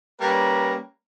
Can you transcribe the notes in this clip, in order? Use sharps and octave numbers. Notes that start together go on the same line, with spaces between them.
G3 A#3 C#4 B4 A#5